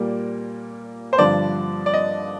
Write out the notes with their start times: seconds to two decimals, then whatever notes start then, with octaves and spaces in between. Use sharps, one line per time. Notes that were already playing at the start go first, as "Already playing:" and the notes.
Already playing: A#2 G3 A#3
1.13 C5
1.18 G2 D3 F3 D5
1.86 D5
1.94 D#5